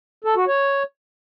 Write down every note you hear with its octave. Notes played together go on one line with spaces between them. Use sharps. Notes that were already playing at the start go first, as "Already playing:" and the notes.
A4
F#4
C#5